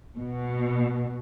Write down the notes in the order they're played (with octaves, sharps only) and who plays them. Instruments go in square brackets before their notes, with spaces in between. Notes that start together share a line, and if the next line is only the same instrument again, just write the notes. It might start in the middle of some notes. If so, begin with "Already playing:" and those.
[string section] B2